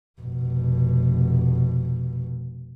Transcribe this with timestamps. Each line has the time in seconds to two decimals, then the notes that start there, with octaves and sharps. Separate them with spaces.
0.21 F1 B2